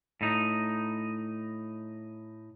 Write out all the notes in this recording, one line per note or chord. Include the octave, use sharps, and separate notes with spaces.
A2 D#4